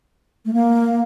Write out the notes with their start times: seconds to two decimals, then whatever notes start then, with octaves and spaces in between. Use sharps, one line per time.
0.45 A3
0.53 A#3